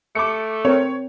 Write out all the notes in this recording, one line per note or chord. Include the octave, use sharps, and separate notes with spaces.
A3 D6 C#7
C4 A#4 C#5